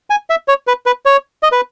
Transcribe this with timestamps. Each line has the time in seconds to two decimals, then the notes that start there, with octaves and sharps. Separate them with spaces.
0.10 G#5
0.30 E5
0.48 C#5
0.67 B4
0.86 B4
1.05 C#5
1.43 D#5
1.52 B4